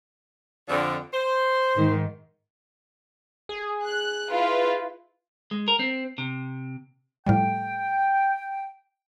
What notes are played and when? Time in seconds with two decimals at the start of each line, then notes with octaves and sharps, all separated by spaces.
0.68 F2 D3
1.13 C5
1.74 G#2 D#3
3.49 G#4
3.85 F#6
4.31 E4 F4 B4
5.51 G#3
5.68 A#4
5.79 C4
6.18 C3
7.27 A2 F3 G3 G5